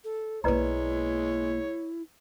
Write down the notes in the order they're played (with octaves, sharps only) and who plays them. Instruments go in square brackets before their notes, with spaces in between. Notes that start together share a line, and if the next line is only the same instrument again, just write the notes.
[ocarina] A4
[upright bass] B1 A#3 [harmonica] G#3 C#5 [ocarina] E4 [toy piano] B4 D5 A#5